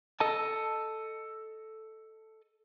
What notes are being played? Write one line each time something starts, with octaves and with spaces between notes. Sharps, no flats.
A4 D#5 A5